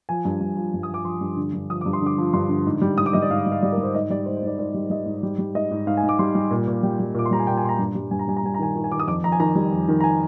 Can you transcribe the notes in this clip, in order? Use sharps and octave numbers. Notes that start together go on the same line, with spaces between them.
F3 G#5
G2
G2
F3
G2
D#6
F3 D6
F3 C6
G2
D3
G2
F3 D#6
G2 D6
C6
D3 D6
F3
G2 C6
D3
G#2
G3
G#2 D#6
D6
G3 D#5
D5
G#2 F5
G3
F5
G3 D5
A#4
G3
C5
G#2 D#5
G3 D5
G#2 C5
C5
G#2 D5
G#2 D5
G3
G3 D#5
G#2
G3
G3
G#2 D#5
G#2
G#2 F5
G#5
G#2
D6
G3 C6
G3
A#2
A#2
G3 G5
G3
A#2 D6
C6
G3 A#5
G#5
A#2 G5
G#5
A#2 C6
A#5
G2
G3
G2 G#5
A#5
G3 G#5
A#5
G3 G#5
A#5
D#3 G#5
D#3
G#5
D#3 D6
D#6
F2 D6
F2 A#5
G#5
D#3 A#5
G3
F2
D#3
A#5
G#5